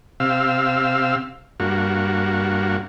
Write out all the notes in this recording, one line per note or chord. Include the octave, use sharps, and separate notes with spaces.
C3 F5 E6
G2 A#3 F#4